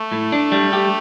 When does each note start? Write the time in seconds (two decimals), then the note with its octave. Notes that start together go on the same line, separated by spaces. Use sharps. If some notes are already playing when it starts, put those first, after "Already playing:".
Already playing: A3
0.12 A2
0.32 D4
0.52 G3
0.73 G4